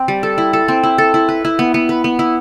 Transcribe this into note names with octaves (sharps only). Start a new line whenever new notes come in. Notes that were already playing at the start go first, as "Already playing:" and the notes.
Already playing: C4
G3
A4
E4
A4
C4
E4
A4
E4
B4
E4
B3
B3
B4
B3
E4